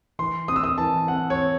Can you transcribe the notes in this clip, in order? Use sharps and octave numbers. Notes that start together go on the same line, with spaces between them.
E3 C6
C4 D#6
E6
D#6
E3 A5
C4 F#5
C#5
C4